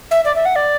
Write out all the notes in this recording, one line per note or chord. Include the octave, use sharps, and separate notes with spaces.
E5
D5
E5
F#5
D5